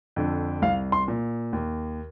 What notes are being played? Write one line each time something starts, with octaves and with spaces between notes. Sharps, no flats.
F2 D3
C2 F5
C6
A#2
D#2